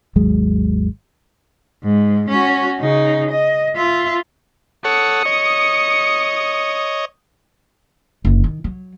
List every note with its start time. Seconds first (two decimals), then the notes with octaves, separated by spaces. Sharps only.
0.16 G#1 D#2 F#3 G#3
1.83 G#2
2.30 C#4 F#4
2.80 C#3 D#4
3.31 D#5
3.76 F4 E5
4.85 A4 C#5 F#5 D#6 C#7
5.25 C#5 D#5
8.25 F#1 D3
8.44 D#3
8.64 F#3